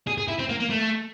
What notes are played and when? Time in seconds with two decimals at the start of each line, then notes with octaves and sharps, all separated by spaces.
0.07 G#4
0.18 G#4
0.28 E4
0.39 C4
0.49 A#3
0.60 A#3
0.70 A3